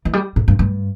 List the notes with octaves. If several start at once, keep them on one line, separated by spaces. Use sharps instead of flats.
E3
G3
A2
G2
G2